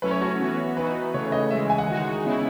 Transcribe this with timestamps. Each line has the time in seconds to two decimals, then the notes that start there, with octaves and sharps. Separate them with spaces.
0.02 F#3 A3 C#4 E4 B4
0.11 C#5
0.21 F#4
0.40 E3 B3 F#4
0.76 E3 B3 D#4 F#4 B4
1.14 C#3 E3 A3 C#5
1.32 D#5
1.50 C#3 E3 G#3 E5
1.70 G#5
1.78 F#5
1.88 D#3 G#3 D#4 F#4
2.25 C#3 G#3 B3 E4